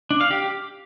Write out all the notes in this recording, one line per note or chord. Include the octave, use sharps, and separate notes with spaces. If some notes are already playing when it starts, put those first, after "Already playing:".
D4
F5
G4